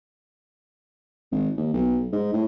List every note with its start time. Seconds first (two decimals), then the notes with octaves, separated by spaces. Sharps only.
1.32 G#1
1.57 D#2
1.74 B1
2.13 G#2
2.33 A2